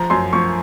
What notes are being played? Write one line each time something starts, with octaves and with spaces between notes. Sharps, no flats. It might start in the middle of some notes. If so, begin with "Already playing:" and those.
Already playing: F3 A#5
F#2 C6
F3 C#6